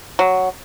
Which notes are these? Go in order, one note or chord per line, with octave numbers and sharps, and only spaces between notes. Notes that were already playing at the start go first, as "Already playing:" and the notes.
F#3